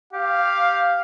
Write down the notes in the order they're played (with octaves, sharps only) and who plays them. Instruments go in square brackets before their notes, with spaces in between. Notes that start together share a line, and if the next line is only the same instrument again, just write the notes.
[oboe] G4 [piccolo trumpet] F5